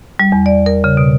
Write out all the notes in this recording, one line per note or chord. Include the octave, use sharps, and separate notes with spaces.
G3
E2
D5
A#4
C#3
B2